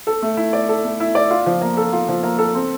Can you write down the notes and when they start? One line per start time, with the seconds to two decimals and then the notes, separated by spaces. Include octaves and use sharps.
0.07 A4
0.22 A3
0.37 E4
0.53 D5
0.69 A4
0.85 A3
1.00 E4
1.15 D5
1.31 F4
1.46 F3
1.62 A#3
1.77 A4
1.93 F4
2.09 F3
2.23 A#3
2.39 A4
2.55 C4